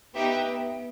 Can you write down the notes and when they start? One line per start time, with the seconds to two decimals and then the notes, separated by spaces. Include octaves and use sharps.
0.14 B3 D#4 G4 B4 E5 G5
0.44 B3